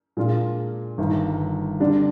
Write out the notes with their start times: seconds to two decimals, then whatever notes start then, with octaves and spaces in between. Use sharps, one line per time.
0.17 A#2 G#3 D4 F4
0.98 G1 G2 D#3
1.80 D3 G3 D4